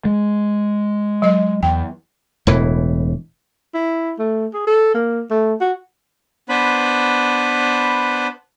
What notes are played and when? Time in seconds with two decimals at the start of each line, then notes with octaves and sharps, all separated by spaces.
0.05 G#3
1.22 F#3 D#5
1.63 E2 G5
2.47 E1 A2 E3
3.74 E4
4.19 A3
4.54 G#4
4.67 A4
4.95 A#3
5.31 A3
5.61 F#4
6.49 B3 D4 B4 C5 B5